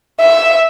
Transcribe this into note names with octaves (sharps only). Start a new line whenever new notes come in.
E5